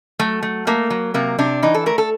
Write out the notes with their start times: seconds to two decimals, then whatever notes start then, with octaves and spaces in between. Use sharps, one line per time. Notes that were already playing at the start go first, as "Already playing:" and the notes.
0.19 F#3 A3
0.43 A3
0.67 A3 A#3
0.90 F#3
1.14 C3 A#3
1.38 C3 D4
1.62 E3 D#4
1.74 A4
1.86 A3 A#4
1.98 A4